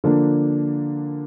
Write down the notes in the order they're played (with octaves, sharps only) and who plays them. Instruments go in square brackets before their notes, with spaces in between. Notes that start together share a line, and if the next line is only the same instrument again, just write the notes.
[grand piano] D3 F3 A#3 D4